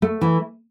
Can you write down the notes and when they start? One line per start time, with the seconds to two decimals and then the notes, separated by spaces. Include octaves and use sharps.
0.02 A3
0.21 E3